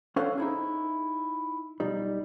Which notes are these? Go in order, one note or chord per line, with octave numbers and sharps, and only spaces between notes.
C#4 A4 C5 F5 F#5
D#4 E4 G#4
B1 G3 D#4